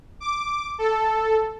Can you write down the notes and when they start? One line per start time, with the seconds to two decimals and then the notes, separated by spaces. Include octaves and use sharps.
0.20 D6
0.79 A4